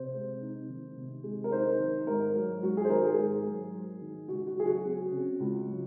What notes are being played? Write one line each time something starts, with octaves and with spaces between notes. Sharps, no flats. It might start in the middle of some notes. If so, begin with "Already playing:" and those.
Already playing: C3 C5
G#3
D#4
D#3
C3
G#3
A#4
D#4 C5
D#3
G#2 A#4
F#3
G#2 F#4
G#4
C5
D#3 A#4
G#4
G#2
F#3
G#2
D#3
C#2 F#4
F#4
F#3 G#4
F#4
C4
C#3
C#2
F#3